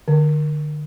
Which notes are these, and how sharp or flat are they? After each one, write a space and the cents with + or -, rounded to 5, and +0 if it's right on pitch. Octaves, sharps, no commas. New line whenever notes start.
D3 +30